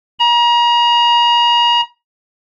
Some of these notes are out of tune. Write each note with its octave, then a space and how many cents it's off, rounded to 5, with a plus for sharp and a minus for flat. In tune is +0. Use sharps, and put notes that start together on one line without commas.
A#5 +35